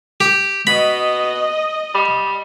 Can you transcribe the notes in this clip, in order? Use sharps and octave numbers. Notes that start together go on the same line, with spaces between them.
G4
B2 D#5 B5
G3